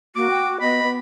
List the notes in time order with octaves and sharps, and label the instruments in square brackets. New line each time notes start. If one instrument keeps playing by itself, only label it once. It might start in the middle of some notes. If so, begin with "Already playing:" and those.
[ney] A#3 [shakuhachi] F#4 [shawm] D6
[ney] G5
[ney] B3 [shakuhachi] D#5 [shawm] B5
[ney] B3